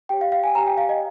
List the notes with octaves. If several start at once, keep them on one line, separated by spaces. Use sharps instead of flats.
G4 C#5 G5
F5
F5
G#5
G4 C#5 A#5
G5
F5
D#5